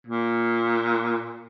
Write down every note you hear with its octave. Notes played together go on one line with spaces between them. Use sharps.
A#2